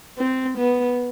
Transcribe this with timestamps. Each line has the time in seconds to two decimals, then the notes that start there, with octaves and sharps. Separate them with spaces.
0.18 C4
0.58 B3